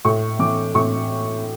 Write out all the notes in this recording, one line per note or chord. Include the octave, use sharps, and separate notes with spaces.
A2 C#6
E3 D6
A2 C#6